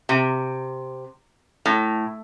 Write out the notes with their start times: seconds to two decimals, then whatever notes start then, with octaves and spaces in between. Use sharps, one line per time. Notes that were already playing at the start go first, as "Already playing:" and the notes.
0.09 C3
1.66 A2